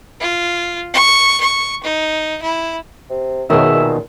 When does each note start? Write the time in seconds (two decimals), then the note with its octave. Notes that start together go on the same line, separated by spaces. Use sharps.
0.21 F4
0.94 C#6
1.41 C#6
1.83 D#4
2.42 E4
3.09 C3
3.50 F#2 B2 D#3 G#4 A#4 E5
3.73 A#2